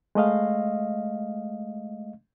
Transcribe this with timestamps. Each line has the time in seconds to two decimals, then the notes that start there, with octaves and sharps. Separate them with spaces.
0.15 G#3 A3 D#5 F5